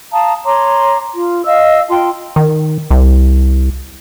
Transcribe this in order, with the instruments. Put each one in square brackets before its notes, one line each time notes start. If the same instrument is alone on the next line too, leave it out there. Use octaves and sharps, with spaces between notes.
[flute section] F5 A5 A#5 D#6
C#5 A#5 C6 D6
F4
D#5 F5 E6
F4 G5 A5 C6
[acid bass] D#3
C2